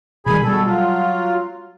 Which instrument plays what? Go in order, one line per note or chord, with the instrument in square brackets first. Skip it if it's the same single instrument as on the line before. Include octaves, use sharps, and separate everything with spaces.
[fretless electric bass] B2 D#3 G3 [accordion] G#4 G#5 B5
[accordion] B2 A4 [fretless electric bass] G3
[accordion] F#3 F4